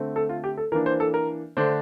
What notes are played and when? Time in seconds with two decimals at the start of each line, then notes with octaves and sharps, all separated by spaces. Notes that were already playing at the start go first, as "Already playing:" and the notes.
Already playing: D3 A3 C4
0.16 A4
0.29 F4
0.44 G4
0.57 A4
0.72 E3 A#3 D4 A#4
0.86 C5
1.00 A4
1.14 A#4
1.57 D3 A3 D4 C5